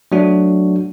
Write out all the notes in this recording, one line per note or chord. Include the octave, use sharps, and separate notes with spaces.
F#3 A3 D4 F#4